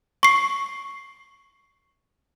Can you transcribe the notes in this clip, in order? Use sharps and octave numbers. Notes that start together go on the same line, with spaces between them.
C#6 C7